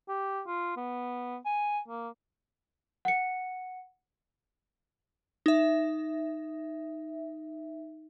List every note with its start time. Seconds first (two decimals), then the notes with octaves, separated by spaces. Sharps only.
0.09 G4
0.47 F4
0.77 B3
1.46 G#5
1.88 A#3
3.05 F#5 C#7
5.46 D#4 E5